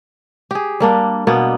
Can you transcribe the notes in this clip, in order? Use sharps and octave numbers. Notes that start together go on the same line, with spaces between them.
G4 G#4
G3 A#3 D4
B2 A#3 B3